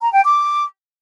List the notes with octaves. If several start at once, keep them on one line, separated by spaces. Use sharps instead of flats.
A#5
G5
D6